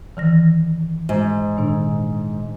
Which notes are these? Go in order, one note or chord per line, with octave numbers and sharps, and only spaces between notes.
D#3 E3 A#6
G#2
A#2 D#3 D4